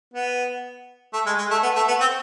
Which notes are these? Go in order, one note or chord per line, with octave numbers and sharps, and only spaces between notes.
B3
A3
G#3
G#3
A3
B3
A3
B3
C4